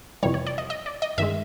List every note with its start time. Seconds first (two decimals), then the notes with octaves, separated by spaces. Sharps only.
0.23 F2 C3 E3 G3 C#5
0.34 C#5
0.46 D5
0.58 D#5
0.70 D#5
0.86 D5
1.02 D#5
1.18 G2 D#3 G#3 E5